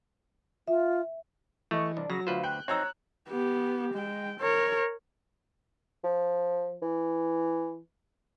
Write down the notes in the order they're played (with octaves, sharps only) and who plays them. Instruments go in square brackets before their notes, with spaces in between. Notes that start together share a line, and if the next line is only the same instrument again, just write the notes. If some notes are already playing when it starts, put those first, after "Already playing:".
[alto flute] F4 [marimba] E5
[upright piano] E3 D#5 [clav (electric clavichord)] A3 [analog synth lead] C#6
[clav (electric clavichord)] C2 [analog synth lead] D4
[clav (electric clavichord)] C#3 [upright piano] F#3 [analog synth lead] A#6
[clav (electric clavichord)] D2 B4 C5 [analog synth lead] F4
[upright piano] G5 [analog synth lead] F#6
[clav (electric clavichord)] C4 D#4 [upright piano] C#5 A#5 E6
[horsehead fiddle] B3 G4
G#3 G5
A#4 C#5
[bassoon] F3
E3